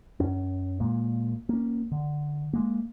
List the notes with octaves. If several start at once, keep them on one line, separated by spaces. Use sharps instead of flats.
F#2 C#4
A#2 G#3 A#3
A#3 C#4
D3
G#3 A#3